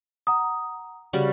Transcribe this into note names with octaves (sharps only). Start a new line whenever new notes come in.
F#5 A#5 D#6
C#3 G3 F#4